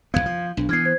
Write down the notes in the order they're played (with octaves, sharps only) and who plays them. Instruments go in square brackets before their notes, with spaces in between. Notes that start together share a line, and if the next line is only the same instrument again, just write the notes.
[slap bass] C2 F2 B3 [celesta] F5 G#6
[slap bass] F3
[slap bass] B1 [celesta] D4
[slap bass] E3 B3 [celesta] F6 G#6 C7
[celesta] C5 G#6